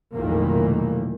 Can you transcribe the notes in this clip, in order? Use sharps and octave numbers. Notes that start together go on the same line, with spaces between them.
F1 B1 A#2 D#3 E3 A#3